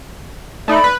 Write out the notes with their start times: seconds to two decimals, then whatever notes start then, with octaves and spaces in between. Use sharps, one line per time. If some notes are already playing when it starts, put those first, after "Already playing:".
0.68 A3 D#4 D5 B5
0.84 B4